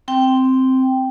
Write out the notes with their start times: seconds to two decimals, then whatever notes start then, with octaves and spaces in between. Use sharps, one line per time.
0.08 C4 G5